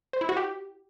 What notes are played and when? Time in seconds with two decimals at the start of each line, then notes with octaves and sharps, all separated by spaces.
0.13 C5
0.21 E4
0.29 F#4
0.37 G4